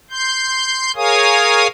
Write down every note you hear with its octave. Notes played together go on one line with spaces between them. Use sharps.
C6 G6
G#4 A#4 C#5 F5 G#5 D#6